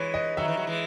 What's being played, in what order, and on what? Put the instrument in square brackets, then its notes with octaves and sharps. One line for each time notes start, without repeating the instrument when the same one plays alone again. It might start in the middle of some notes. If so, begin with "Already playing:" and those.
Already playing: [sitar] E3 G#3 [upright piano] B4 C#5
[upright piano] D#5
[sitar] D#3 F#3 [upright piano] E5
[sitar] E3
F#3
E3 G#3